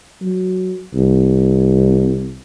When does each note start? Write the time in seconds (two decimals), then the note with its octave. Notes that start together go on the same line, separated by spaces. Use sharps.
0.22 F#3
0.95 C2